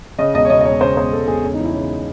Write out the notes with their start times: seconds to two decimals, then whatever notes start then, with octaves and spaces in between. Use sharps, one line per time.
0.19 C#3 D#5
0.34 E1 D#5
0.45 C#5
0.50 C#3 D#5
0.61 D#5
0.65 E1 C#5
0.81 C#3 C5
0.97 E1 C5
1.12 E1 A4
1.27 E1 G#4
1.43 C#3
1.54 D#4
1.60 E3 E4
1.74 C#3